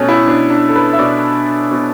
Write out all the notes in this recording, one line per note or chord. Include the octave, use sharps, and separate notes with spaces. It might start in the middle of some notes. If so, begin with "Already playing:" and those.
Already playing: B2 A3 C#4
E4
B2 D4
D4
A4
B4
E5
B2 D5
B2